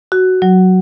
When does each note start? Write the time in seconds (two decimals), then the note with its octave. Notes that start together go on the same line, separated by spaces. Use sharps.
0.12 F#4
0.42 F#3